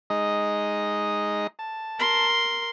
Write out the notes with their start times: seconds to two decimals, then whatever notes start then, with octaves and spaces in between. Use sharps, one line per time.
0.10 G#3 D#4 D#5
1.59 A5
1.99 A#4 C6